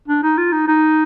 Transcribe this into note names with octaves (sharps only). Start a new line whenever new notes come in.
D4
D#4
F4
D#4
D#4